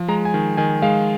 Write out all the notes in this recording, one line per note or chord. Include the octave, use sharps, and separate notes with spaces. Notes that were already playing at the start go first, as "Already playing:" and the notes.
Already playing: F3
G#3 A#5
G#5
D#3
D#3 G#5
G#3 F5